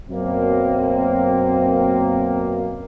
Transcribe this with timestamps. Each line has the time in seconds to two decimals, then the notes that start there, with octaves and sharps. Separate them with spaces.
0.10 F#2 B2 A#3 C4